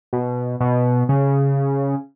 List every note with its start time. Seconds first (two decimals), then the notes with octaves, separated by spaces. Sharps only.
0.13 B2
0.60 B2
1.09 C#3